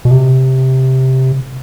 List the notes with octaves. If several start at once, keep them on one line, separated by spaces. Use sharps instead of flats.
B2
C3